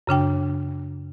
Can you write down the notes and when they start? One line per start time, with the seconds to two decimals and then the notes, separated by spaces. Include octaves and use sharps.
0.07 F#2 C#3 D4 G5